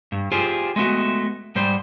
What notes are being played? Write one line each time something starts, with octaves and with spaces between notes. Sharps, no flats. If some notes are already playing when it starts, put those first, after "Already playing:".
G2
F4 G4 G#4 C5
G#3 A3 B3 F#4
G#2 G3 C5